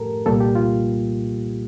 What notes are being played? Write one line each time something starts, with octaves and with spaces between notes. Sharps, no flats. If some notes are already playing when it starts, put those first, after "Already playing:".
Already playing: A2 A3 G4 A4 A#4
C2 A#2 G3 A#3 A4
G4
F4